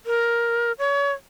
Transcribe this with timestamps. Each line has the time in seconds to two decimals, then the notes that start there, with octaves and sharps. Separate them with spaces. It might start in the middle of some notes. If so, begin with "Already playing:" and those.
0.06 A#4
0.79 C#5